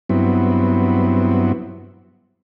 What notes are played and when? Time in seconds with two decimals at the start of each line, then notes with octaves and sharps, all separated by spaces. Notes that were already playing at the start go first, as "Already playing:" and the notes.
0.09 G2 F#3 B3 C4 E4